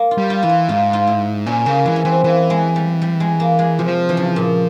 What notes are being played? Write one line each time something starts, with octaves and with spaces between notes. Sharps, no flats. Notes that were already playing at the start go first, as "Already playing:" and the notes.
Already playing: A#3
F4
G3
F4
E3 F4
E4
G#2 F4
F4
E4
A#2 C#4
C#3 A#3
E3 G#3
C#4
E3 C4
E3 A#3
G#3
G3
G3
G#3
A#3
G#3
C3 F3
E3
C#3
A#2